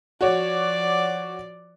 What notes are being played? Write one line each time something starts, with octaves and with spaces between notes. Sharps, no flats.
F3 F#4 C#5 D5 D6